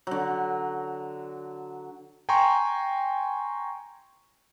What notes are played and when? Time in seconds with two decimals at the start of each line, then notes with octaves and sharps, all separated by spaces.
0.07 D3 F#3
2.29 G5 G#5 A#5 C6 C#6